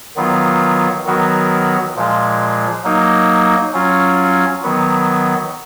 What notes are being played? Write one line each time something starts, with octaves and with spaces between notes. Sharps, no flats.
D#3 F#3 B3 F4
D#3 F#3 B3 F#4 A#4
A#2 F3 G#3
F#3 A#3 D#4
F#3 C#4 F4
D#3 F#3 B3